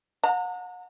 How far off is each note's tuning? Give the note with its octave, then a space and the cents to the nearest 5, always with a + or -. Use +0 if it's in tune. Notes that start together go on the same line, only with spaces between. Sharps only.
F#5 -35 A#5 -35